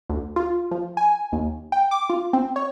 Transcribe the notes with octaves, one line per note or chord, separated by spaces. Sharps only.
D2
F4
F3
G#5
D#2
G5
D6
F4
C4
C#5